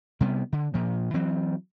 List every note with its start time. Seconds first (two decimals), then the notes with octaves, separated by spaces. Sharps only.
0.20 C3 G3 A3 B3
0.52 D3
0.74 A#2 F3
1.14 E3 F#3 C4